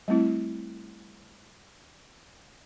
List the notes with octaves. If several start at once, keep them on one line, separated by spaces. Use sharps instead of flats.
G3 A3 C4 E4